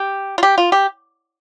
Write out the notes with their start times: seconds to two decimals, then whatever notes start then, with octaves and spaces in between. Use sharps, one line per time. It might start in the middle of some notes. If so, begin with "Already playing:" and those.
Already playing: G4
0.38 F4
0.43 G4
0.58 F4
0.72 G4